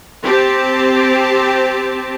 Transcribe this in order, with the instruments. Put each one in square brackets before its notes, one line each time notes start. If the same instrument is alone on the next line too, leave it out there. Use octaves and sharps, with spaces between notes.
[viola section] C4 G4 A5